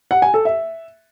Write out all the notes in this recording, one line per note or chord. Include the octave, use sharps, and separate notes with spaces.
F#5
G#5
A4
E5